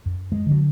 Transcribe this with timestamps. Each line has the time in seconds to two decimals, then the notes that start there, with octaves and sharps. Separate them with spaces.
0.06 F#2
0.32 G#3
0.46 D3 F#3